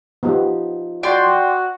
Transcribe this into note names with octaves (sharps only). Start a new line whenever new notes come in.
F3 B3 D#4 G4
F#4 D5 G5 C6